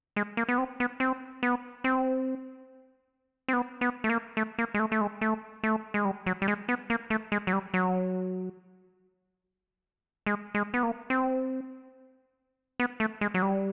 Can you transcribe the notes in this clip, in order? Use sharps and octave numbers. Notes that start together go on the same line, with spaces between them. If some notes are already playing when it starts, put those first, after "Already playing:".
G#3
A#3
B3
C4
B3
C4
B3
C4
C4
B3
B3
A3
A#3
A3
A#3
G#3
A3
A3
G#3
A3
A3
G#3
G3
F#3
G3
G#3
B3
A#3
A3
G#3
F#3
G3
F#3
G#3
G#3
B3
A#3
C4
B3
A3
G#3
F#3
G3